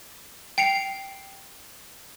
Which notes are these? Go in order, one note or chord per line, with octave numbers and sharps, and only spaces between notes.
G5 C7 C#7 F7